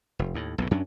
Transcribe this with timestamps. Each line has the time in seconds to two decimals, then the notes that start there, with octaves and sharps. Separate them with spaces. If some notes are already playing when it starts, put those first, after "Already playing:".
0.19 F1
0.34 D#2 A2
0.58 B1 F#2 A2
0.71 F#2 F#3 C#4 D4